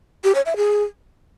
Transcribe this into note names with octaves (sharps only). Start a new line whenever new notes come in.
G4
C#5
E5
G#4